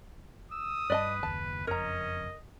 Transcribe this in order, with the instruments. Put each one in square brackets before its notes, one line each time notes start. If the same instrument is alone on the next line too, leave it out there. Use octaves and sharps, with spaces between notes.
[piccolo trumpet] D#6 [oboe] E6
[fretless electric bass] G2 [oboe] B4 [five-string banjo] D5 D#5 A5
[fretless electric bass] F#1 D#2 [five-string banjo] A5
[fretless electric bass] F#1 F2 [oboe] C#4 [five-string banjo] A#4 A#5 [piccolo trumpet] D#5